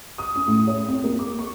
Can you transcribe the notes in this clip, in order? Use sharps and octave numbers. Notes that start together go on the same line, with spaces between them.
D#6
C#4
A2
C#5
C4
A#3
D6
C#6